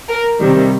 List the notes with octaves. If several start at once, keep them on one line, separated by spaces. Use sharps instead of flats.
A#4
C3 D#3 G3